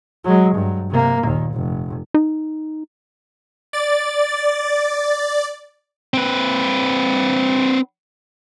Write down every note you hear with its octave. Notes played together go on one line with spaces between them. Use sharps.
F#3 G#3
G2 F#3
C3 A#3
D#2 A#2
F1
D#4
D5 A6
C4 B4